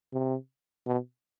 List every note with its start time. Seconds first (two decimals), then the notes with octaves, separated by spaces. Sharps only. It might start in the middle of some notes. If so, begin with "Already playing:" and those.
0.13 C3
0.86 B2